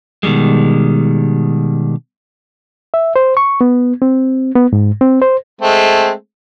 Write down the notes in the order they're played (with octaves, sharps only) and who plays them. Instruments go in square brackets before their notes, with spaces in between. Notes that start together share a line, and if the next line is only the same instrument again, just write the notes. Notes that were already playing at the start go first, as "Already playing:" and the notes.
[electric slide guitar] B2 D#3 E3 G3 G#3
[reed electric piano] E5
C5
C#6
B3
C4
B3
G#2
C4
C5
[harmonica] G#3 A3 C4